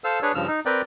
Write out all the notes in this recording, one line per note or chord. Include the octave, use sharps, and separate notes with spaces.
A4 C5 F5 E6
D4 G#4 B4 C#5
G2 C#3 F3 E6 F6
D#4
C4 A#4 B4 D5 G5